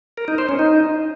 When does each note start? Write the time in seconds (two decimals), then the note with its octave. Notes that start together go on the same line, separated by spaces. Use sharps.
0.18 A#4
0.28 D#4
0.38 C5
0.49 C#4
0.59 D#4